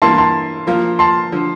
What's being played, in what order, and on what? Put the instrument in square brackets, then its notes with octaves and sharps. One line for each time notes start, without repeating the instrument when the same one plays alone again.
[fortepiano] G2 E3 A#3 E4 [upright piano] A5 C6
[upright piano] A5 C6
[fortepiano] F3 A#3 F4
[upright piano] A5 C6
[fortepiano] D3 F3